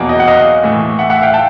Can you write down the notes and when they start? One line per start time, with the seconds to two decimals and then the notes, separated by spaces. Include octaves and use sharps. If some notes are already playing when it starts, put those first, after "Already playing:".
Already playing: E2 B2 F#3 A#3
0.09 D#5
0.20 F#5
0.27 D#5 F5
0.64 A2 E3 A3
0.99 E5 F#5
1.10 E5 F#5
1.22 F5 G5
1.34 G5 A5